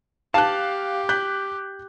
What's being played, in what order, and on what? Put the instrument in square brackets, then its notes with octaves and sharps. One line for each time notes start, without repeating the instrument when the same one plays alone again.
[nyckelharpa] G4 [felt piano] F5 F#6 [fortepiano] A5
[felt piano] F#6 G6 B6